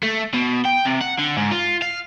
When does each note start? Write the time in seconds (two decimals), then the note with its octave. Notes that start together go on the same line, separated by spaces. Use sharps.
0.03 A3
0.34 B2
0.65 G5
0.85 C3
1.01 F#5
1.19 D3
1.37 G#2
1.51 F4
1.82 F5